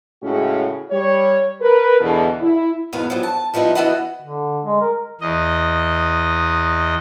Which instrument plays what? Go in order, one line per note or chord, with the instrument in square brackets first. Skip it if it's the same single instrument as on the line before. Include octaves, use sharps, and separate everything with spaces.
[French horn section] A2 C#3 G#3 A3 C#4 F#4
G3 C#5
A#4 B4
E2 B2 D3
E4
[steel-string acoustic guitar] E2 G#2 B2 B3 F5
G2 F3 F#3
A5
F3 G3 B3 D#4 E4
E3 G#3 B3 F#4 D#5 F#5
[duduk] D3
G#3
A#4
[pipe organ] E2 D#5